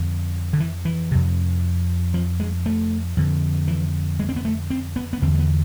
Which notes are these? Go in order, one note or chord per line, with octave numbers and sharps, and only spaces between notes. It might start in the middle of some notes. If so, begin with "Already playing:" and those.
Already playing: F2 D3
D3
E3
E3
F2 C3
F3
G#3
A3
F2 D3
E3
G#3
C4
B3
A3
C4
B3
B3
E2 D3 C4
A3
B3